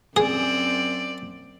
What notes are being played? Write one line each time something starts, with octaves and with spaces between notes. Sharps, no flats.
F#2 C4 G#4 D5